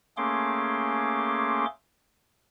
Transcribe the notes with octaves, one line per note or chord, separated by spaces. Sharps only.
A3 A#3 C#4 G#4 C6 D6